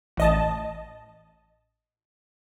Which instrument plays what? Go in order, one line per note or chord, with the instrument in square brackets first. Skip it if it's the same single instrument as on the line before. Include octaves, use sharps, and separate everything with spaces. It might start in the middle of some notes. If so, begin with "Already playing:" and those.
[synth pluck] A1 D#5 A5